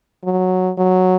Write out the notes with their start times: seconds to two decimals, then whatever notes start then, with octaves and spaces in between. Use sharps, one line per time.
0.24 F#3
0.78 F#3